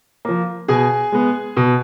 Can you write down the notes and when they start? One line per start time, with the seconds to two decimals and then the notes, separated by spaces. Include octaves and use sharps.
0.25 F3 A#3
0.68 B2 G#4 G#5
1.12 G#3 B3
1.57 B2